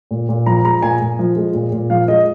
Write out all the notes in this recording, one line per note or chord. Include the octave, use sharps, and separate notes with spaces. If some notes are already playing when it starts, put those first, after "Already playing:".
A#2
A#2
F3 A#5
G#3 A#5
A#2 G#5
A#2
F3
G#3
A#2
A#2
F3 F5
G#3 D#5